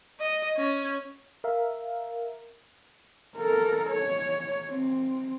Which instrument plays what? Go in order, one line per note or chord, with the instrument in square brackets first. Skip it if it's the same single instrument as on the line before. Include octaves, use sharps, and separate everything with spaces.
[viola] D#5
C#4
[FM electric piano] A#4 E5 F5
[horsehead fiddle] A4 A#4
C#5
C4